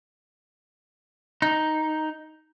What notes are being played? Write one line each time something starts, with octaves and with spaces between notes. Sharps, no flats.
D#4